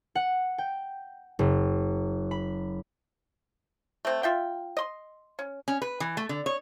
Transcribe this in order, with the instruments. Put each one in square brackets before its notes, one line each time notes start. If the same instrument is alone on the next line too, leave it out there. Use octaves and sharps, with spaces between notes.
[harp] F#5
G5
F#1
B5
[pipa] A3 C4
F4 E5 G5
D#5 C6
C#4
[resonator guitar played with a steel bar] C#4
B4
E3
A3
D3
C#5